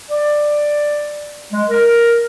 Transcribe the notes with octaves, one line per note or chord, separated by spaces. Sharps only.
D5
G#3
A#4